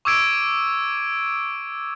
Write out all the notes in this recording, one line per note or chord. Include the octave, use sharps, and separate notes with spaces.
C#6 D6 E6 G#6 D7